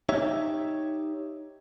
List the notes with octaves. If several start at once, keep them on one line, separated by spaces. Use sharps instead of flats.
D#4 G4 C#5 E5